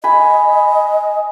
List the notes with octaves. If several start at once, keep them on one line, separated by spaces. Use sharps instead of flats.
D#5 G#5 B5